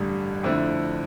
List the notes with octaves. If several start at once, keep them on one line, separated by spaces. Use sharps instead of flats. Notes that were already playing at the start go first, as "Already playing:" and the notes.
Already playing: A1 G2 D3 G3
F2 D3 A3 C4 E4